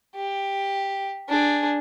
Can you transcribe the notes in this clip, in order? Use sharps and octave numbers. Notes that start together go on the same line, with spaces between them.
G4
D4 G#4